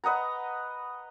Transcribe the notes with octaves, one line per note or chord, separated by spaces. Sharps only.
B4 D#5 F#5 A#5